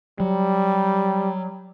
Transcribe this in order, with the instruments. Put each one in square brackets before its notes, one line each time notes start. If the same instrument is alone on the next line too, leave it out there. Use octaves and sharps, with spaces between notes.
[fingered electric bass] F#3 [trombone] G3